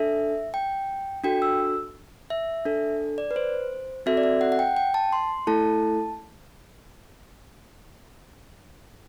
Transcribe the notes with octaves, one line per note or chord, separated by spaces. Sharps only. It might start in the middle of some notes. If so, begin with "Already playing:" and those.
Already playing: D4 A4 E5
G5
D4 F#4 A4 G5
E6
E5
D4 A4
D5
B4
C5
C4 F#4 A4 E5
D5
E5
F#5
F#5
G5
G5
A5
C6
A3 E4 A4 A5